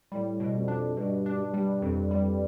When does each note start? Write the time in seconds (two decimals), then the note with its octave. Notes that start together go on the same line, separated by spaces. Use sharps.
0.12 A2 G3
0.40 B2
0.55 F2
0.68 D4
0.97 G2 B2
1.26 D4
1.39 G2
1.54 G3
1.82 F2
2.11 G3